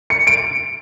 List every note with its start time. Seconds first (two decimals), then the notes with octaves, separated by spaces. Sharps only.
0.10 C#7
0.27 D7